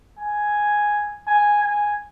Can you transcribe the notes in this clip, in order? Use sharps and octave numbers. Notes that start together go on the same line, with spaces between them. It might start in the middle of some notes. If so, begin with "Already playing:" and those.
G#5
G#5
G#5